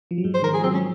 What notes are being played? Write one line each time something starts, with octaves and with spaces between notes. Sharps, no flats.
F3
F#3
G#2 G#3
C5
D#3 A#4
F3 G#4
F#3 C4
G#3 C#4